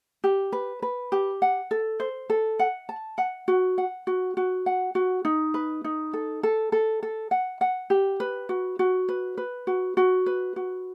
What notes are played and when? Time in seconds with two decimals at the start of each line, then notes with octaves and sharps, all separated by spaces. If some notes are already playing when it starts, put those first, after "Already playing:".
0.24 G4
0.53 B4
0.82 B4
1.12 G4
1.42 F#5
1.71 A4
2.00 C5
2.30 A4
2.59 F#5
2.89 A5
3.18 F#5
3.48 F#4
3.78 F#5
4.07 F#4
4.37 F#4
4.66 F#5
4.95 F#4
5.25 D#4
5.54 B4
5.84 D#4
6.13 A4
6.43 A4
6.72 A4
7.03 A4
7.31 F#5
7.61 F#5
7.90 G4
8.20 B4
8.49 F#4
8.79 F#4
9.09 B4
9.37 B4
9.67 F#4
9.97 F#4
10.26 B4
10.56 F#4